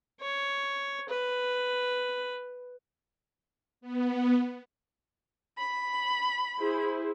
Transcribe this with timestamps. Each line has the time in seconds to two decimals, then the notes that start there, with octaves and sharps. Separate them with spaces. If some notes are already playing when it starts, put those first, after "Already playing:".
0.21 C#5
1.09 B4
3.81 B3
5.58 B5
6.58 E4 G#4 C5